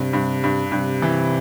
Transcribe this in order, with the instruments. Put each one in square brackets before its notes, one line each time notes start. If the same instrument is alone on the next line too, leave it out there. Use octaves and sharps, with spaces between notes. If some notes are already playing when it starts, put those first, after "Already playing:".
Already playing: [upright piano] G2 [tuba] C3
[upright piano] G2
G2
[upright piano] G2 [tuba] C3
[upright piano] E3